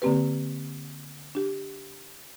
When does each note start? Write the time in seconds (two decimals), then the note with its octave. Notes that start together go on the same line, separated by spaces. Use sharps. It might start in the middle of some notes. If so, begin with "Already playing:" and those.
0.02 D3 A#3 C4 G4 B4
1.35 D4 G4